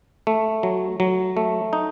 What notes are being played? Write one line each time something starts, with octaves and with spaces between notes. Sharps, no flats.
A3
F#3
F#3
A3
D#4